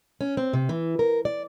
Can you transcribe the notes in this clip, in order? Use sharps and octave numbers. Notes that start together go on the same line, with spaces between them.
C#4
C4
C3
E3
A#4
D5